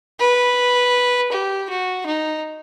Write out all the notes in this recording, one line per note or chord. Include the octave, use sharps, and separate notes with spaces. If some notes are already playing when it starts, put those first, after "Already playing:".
B4
G4
F#4
D#4